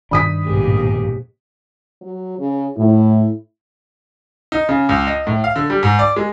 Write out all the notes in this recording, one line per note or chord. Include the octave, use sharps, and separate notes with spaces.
G2 D#3 D4 B5 D#6 B6
A#1 D#2 G#2 B2 G4 G#4
F#3
C#3
A2 E4
D#4
C#3
C#2
D#5
A2
F5
D3
G3
G#2
D5
G#3